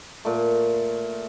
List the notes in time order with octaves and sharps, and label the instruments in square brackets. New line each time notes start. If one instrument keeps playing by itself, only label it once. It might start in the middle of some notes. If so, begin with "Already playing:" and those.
[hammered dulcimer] A#2 A3